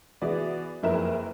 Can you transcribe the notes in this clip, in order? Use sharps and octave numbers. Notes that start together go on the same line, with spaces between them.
E3 B3 F#4 G#4 D5
F#1 F2 E4 A#4 B4 E7